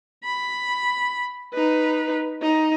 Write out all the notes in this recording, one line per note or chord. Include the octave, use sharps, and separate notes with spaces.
B5
D#4 B4
D#4